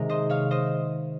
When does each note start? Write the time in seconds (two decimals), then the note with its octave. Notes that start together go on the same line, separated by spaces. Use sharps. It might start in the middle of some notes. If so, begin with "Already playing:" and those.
Already playing: C3 D#3 G#3 A#4
0.09 C5 D#5
0.30 C#5 F5
0.51 C5 D#5